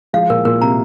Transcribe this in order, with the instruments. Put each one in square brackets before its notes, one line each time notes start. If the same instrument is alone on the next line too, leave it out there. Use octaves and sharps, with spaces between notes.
[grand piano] F3 G#3 [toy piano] F5
[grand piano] A#2 [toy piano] A#4
[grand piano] A#2 [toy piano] A#4
[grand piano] C3 [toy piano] A#5